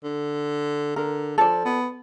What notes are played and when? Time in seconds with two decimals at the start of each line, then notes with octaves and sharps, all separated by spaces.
0.04 D3
0.96 D3 A#4
1.38 F3 A4 D5
1.65 B3